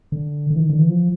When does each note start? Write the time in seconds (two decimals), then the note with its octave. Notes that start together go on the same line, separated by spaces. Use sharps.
0.12 D3
0.50 D3
0.56 E3
0.60 D#3
0.70 D3
0.79 E3
0.89 F3